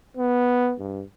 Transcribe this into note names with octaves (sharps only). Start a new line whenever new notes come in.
B3
G2